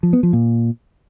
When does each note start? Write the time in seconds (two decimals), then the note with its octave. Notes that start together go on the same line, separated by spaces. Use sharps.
0.03 F3
0.13 B3
0.23 F3
0.33 A#2